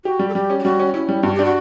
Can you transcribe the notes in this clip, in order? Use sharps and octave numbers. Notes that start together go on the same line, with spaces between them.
F#4 G4
G3
A4
G3 G4
C#4
G4
G3 F#4
C#4
C#4 E4
G3
G2 F#4
D4 G4
F#4